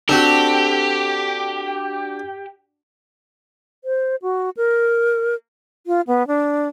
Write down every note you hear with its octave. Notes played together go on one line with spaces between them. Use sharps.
C4 D4 F#4 G4 A4
C5
F#4
A#4
F4
B3
D4